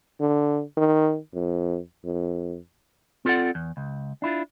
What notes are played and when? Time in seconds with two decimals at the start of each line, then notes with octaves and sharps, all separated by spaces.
0.20 D3
0.77 D#3
1.34 F2
2.04 F2
3.25 C4 F4 A4 B4 D5 F#5
3.55 E2
3.77 C#2
4.22 D4 E4 F4